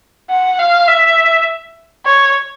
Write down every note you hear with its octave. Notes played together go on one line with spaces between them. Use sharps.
F#5
F5
E5
C#5